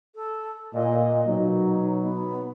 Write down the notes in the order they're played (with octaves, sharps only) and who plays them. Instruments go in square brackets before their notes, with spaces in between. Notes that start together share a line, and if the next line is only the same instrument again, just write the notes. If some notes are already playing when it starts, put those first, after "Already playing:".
[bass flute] A4
[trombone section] A#2 [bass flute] D#5
[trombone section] B2 F#3 [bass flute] D#4
[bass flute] B3